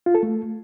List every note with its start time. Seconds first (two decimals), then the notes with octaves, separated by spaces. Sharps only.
0.06 F4
0.15 A4
0.23 A3